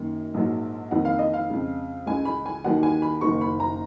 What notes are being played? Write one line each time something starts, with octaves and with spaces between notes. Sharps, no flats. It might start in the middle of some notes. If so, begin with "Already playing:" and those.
Already playing: F#2 D#3 A#3
A#1 G#2 F#3 A#3
F2 D#3 A#3 F#5
F5
D#5
F5
F2 C#3 G#3
C#2 C#3 G#3 G#5
B5
G#5
D#2 D#3 F#3 F#5
G#5
B5
F#1 F#2 D#3 A#3 C#6
B5
A#5